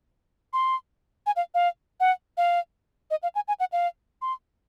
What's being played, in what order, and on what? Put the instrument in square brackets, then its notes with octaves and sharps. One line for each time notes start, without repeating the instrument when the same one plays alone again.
[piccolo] C6
G#5
F5
F5
F#5
F5
D#5
F5
G#5
G#5
F#5
F5
C6